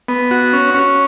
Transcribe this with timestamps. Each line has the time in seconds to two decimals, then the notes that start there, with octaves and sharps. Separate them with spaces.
0.08 B3
0.31 F#4
0.53 C#4
0.74 C#4